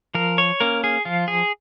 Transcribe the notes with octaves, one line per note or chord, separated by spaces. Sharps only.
F3 A#4
C#5
A#3 C#4 A#4
G#4
F3 F4
G#4